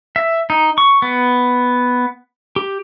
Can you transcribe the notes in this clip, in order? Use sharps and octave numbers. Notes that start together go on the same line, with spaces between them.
E5
D#4
C#6
B3
G4